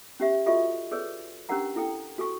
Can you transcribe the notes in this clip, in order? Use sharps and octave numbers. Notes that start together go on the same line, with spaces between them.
C#4 G4 E5
F4 F#4 A4 D#5 E5 C#6
G#4 A4 B4 C#5 D5
C#4 D4 G4 A#4 F#5 A#5
E4 A4 G5
F#4 A4 G#5 C#6